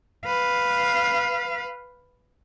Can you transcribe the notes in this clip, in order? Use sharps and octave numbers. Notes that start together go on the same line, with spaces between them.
B4 F5